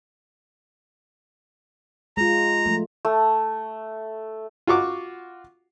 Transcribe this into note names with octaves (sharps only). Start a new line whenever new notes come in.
G#3 F4 A#5
F3 G#3 A3
A3
F4 F#4 C#6 D6